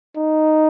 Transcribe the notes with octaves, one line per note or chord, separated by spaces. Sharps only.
D#4